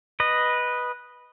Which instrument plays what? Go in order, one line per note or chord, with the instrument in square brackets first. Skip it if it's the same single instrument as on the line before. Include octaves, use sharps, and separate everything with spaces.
[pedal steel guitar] B4 D#5